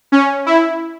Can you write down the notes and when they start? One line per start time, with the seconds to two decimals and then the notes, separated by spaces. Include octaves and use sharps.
0.12 C#4
0.46 E4